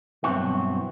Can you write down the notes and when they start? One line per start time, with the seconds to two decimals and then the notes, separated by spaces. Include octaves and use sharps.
0.24 G2 B2 E3 F#3 C4 F#4